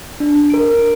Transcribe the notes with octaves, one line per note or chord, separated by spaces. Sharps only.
D4
A#4 D7